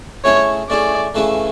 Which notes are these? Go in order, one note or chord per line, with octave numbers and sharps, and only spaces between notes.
A3 C#4 E4 G#4 C#5
A3 C#4 E4 G#4 D5
C#3 E3 A3 C#4 E4